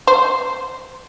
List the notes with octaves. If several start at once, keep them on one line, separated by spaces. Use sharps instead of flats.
C5